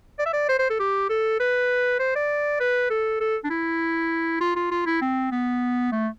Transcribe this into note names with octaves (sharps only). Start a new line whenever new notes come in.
D5
E5
D5
C5
C5
A4
G4
A4
B4
C5
D5
B4
A4
A4
D4
E4
F4
F4
F4
E4
C4
B3
A3